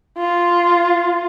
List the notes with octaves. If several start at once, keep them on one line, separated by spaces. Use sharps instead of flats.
F4